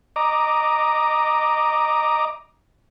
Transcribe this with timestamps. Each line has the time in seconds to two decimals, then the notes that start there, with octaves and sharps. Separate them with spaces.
0.16 D#5 A#5 D6